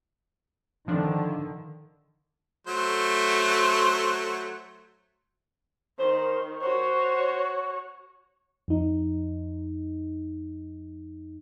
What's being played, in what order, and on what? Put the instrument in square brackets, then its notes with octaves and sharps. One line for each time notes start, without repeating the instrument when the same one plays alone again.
[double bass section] D3 D#3 [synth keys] F3 D4
[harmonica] F#3 A3 C5
[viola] D#3 [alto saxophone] C5
[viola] F#4 C#5 [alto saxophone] C5
[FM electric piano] F2 D#4